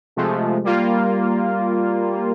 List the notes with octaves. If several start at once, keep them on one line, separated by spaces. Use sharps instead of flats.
C3 F3 G#3 A3
G3 A#3 F4